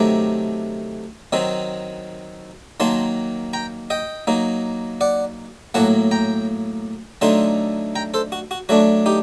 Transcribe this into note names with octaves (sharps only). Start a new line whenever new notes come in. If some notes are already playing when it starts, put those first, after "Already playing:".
Already playing: C3 D#3 F#3 A3 A#5 D6
D#3 F#3 C4 D#4
D#3 F#3 A#3 A5 C6
G5 A#5
D#5 G5
F#3 A#3 D#4
D5 F#5
A2 F#3 A#3 F#5 A5
G5 A#5
D3 F#3 A3 D#4 A5 C6
G5 A#5
A4 C5
F#4
F#4
F#3 A3 D4 F#4
D#4 G4